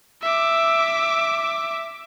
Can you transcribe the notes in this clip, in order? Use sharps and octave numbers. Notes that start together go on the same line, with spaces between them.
E5 D6